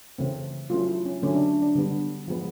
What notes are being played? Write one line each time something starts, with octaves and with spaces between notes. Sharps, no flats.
C#3 E3 A3 C4
F#3 A3 C#4 F4
E4
C#4
D3 F#3 A3 C#4
D4
D4
D3 G3 B3
F3 G#3 B3